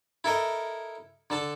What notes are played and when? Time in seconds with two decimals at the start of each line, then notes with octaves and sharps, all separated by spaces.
0.24 E4 A4 A#4 D#5
1.30 D3 A4 A5